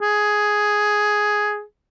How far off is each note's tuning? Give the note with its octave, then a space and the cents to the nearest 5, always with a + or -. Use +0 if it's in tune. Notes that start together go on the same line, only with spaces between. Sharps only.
G#4 +5